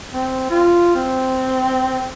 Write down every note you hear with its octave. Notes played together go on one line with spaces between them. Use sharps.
C4
F4
C4